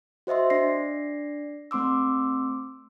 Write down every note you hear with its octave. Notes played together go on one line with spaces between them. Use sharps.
F#4 C5 D#5 E5 C6
D4 D5 A#6 C7
A3 C4 C6 D6 E6